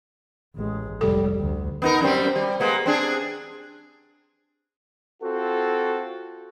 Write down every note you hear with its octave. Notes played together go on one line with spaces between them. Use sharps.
A1 G#3
F1 G3 A4
D2
B3 D#4 A#4
F#2 G3 C4
G3
G#3 A#3 B3
C4 D4 G#4
C4 F4 F#4 A4